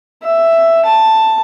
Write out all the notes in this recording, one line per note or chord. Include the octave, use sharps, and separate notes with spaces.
E5
A5